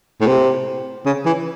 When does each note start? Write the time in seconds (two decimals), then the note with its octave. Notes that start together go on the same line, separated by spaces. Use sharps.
0.20 A2
0.27 C3
1.06 C#3
1.26 E3